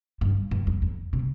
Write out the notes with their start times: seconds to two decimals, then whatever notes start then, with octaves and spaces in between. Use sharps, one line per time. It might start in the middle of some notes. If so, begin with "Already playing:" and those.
0.21 G2
0.51 G2
0.67 F2
0.82 F2
1.13 C3